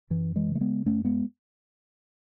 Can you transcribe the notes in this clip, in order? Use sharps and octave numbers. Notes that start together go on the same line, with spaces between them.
F#2 E3
E3 G#3
C#3
A3
G#3 B3
F#2 A3 C#4
G#3 B3